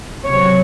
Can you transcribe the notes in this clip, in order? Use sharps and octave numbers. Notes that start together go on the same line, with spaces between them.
C3 F#3 C4 C#5